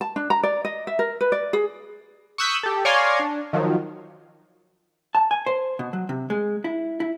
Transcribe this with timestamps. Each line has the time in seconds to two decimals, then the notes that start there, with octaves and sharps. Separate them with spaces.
0.01 A5
0.16 D4
0.30 A#5
0.43 D5
0.65 D#5
0.87 E5
0.99 A#4
1.21 B4
1.32 D5
1.53 G#4
2.38 C#6 D#6 E6 F#6 G6 B6
2.63 G4 A4
2.85 C#5 D5 F5 G#5 A#5 C6
3.19 D4
3.53 D#3 F3 F#3
5.15 A5
5.31 G#5
5.46 C5
5.79 B2
5.93 F#3
6.09 C3
6.30 G#3
6.64 E4
7.00 E4